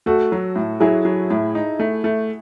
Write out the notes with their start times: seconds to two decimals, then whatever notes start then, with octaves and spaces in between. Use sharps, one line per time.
0.06 A3 F#4 A4
0.32 F#3
0.56 A2
0.80 F#3 E4 G#4
1.05 F#3
1.30 A2
1.55 D#4
1.80 A3
2.04 A3